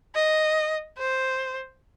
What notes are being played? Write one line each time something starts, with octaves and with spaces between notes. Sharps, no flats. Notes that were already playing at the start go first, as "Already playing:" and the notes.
D#5
C5